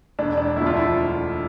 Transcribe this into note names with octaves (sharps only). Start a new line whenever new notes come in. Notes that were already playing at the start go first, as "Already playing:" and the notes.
E1 D4
D4
D2 D3 F3 E4
F4
E4